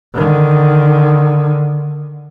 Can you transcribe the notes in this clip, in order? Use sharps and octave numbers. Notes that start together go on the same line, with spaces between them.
D3 D#3